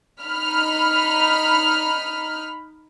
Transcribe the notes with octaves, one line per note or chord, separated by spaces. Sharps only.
D#4 B5 F6